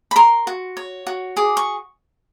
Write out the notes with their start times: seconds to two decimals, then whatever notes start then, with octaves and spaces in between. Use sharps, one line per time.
0.11 B5
0.16 A#4 C6
0.47 F#4
0.77 C#5
1.07 F#4
1.37 G#4 D6
1.57 C#6